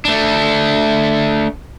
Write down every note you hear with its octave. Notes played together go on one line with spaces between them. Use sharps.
A3 D4